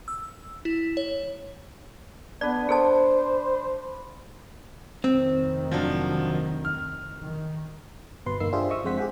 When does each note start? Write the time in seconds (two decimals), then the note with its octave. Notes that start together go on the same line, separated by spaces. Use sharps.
0.08 E6
0.65 E4
0.97 C#5
2.41 B3 D4 B4 D5
2.69 G#4 A4 C5 A5
5.04 F1 D#3 C4
5.71 F3 F#3 D4
6.65 F6
7.21 D#3
8.26 G1 B2 B4 C6
8.40 G1 E2 A#3 D#4 E6 C7
8.52 D4 F4 G4 G#4 C5 E5
8.70 D#5 E5 C#6 D#6 E6
8.84 F2 G#3 C4 C5 F#5 B6
8.98 G4 G#4 F#5 G5